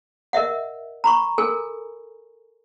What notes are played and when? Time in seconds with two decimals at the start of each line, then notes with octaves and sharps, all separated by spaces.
0.33 A#4 D#5 E5 F#5
1.04 A#5 B5 C#6
1.38 A4 A#4 G#5